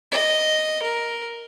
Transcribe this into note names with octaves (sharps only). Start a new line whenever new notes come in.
D#5
A#4